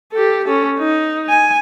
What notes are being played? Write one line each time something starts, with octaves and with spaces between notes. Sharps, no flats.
G4 A4
C#4 A4
D#4
G#5